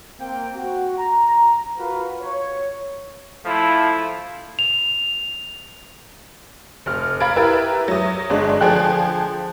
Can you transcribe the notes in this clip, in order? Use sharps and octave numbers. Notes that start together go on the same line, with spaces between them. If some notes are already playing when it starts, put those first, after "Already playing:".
A#3 C4 G5
F#4
A#5
F4 F#4 A#4 B4 F5
C#5
F3 A3 E4
F7
F1 F6
F5 A#5 B5 G#6 A6 D7
E4 G4 A#4 B4 E5
F#3 D#6
G1 G#3 D4
D3 F3 G#4 G5 F#6